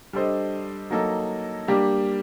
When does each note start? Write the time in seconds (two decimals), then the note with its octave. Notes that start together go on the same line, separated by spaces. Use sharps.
0.13 G3 D4 A4 C5 D#5
0.90 F#3 A#3 D#4 A4
1.68 G3 A#3 D4 G4